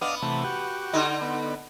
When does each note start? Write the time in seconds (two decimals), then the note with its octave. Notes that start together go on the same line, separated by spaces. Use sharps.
0.01 B3 D4 D#5 F5
0.22 C3 E3 A3
0.44 F#4 G4
0.93 D3 D#4
1.21 B3